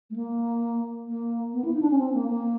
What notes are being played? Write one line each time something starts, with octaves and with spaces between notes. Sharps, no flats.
A3
A#3
A#3
B3
E4
D#4
D4
C#4
C4
A#3
A#3